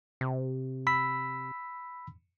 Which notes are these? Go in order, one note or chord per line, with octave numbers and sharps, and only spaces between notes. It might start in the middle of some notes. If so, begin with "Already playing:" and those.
C3
B5 E6 B6